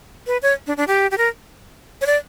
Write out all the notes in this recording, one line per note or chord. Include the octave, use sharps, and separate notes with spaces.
B4
C#5
D4
D4
G4
G4
A#4
C#5
D5